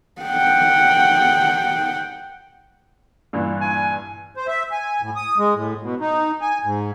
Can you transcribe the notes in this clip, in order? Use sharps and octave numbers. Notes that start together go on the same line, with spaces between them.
F#5 G5
G2 A#2 E3
G#5
C5
E5
G#5
A2
D#6
G#3
A2
B2
D#4
G#5
G#2